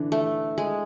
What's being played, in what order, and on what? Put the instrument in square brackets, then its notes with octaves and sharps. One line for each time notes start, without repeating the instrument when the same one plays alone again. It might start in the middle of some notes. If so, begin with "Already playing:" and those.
Already playing: [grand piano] D3 E3 [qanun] D4
[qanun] A3
G#3